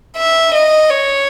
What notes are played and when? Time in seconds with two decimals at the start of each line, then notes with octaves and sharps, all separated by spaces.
0.17 E5
0.54 D#5
0.91 C#5